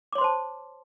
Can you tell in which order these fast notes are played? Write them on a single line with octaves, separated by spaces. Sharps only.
D6 C#5 C6 C5 A5